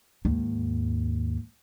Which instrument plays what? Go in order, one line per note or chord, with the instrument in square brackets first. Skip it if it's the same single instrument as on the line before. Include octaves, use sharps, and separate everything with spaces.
[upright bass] D#2 G#2